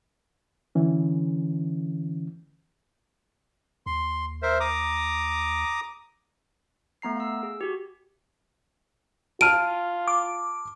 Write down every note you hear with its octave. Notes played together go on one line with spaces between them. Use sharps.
D3 E3 C#4
D#2 C6
A#4 C5 E5
A#5 D6 D#6
A3 B3 A#5 C7
F5 E6
G#4
F#4 G4
F4 A5 F6 D7 D#7
D6